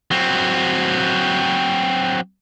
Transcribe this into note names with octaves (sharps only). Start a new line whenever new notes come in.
F#3 C4